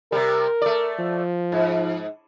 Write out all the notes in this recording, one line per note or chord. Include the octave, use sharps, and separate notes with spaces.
C3 G3 A#4
A3 D5
F3
G#2